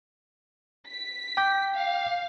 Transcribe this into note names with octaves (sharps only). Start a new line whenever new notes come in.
B6
G5 D6 G6
F5